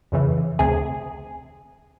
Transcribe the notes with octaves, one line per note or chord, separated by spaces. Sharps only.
F2 C#3 E3
D2 C3 G#4